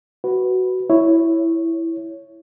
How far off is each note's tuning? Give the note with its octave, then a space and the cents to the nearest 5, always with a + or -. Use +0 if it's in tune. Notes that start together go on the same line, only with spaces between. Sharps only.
F#4 +10 B4 +0
E4 +0 C#5 +0